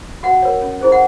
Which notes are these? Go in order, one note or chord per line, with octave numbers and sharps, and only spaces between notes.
F#4 F#5
A#4 C#5
C#4
E4 G#4 C5
F#5